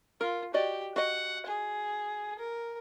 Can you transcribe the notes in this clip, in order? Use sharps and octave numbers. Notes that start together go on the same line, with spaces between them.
F4 A#4
F#4 G4 D5 D#5
F#4 D#5 F#5
G#4
A#4